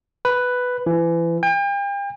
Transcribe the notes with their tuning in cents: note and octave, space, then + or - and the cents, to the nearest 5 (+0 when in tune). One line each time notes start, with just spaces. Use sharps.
B4 +5
E3 +30
G5 +40